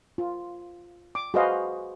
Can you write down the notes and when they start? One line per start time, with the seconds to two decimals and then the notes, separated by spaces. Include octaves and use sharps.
0.18 F4
1.15 D6
1.34 F#4 G#4 B4 C5 D#5 F5